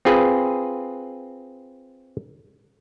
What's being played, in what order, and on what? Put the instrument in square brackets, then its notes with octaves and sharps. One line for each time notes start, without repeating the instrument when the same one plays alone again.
[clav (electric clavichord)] C4 F4 G#4 B4